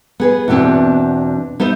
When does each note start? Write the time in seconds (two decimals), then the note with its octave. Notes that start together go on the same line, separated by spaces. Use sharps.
0.20 B3 G#4 B4
0.48 E2 B2 B3 C4 D4
1.60 B3 D#4 C5 E5